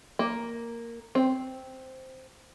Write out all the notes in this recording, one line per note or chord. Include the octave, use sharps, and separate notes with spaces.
A#3
C4